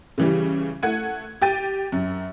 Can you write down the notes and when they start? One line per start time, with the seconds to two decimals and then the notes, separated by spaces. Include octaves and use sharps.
0.18 C#3 E3 G3
0.83 A3 F#5 G#6 D#7
1.42 G4 G5 A6 D#7
1.92 F#2